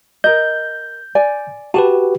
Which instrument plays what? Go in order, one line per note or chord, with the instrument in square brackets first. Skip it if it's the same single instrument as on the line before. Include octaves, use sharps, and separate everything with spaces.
[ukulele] A#4 D#5 [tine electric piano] G6
[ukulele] D5 G#5
[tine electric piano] F#4 G4 B4 [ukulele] A5